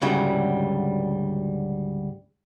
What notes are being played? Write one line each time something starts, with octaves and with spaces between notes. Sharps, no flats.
D2 G#2 C#3 F#3 G3 E4